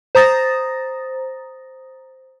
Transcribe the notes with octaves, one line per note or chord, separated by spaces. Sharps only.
C5 A#5 D#6 A6 A#6